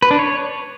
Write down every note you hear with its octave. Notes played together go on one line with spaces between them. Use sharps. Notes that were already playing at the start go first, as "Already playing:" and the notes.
B4
D4
C#5